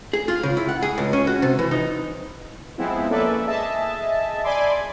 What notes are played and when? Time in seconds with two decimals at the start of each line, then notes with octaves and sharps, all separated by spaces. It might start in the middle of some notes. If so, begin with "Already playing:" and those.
0.13 G#4
0.28 F4
0.43 C#3
0.57 E4
0.69 F#5
0.82 G#4
0.98 C#2
1.13 C#4
1.27 F#4
1.42 C3
1.59 E3
1.71 D#4
2.78 F3 G#3 B3 C4 E4
3.09 A#3 C#4 A4 B4 D5 E5
3.47 G#4 D#5 E5 A5
4.44 D5 G#5 B5 C6 D6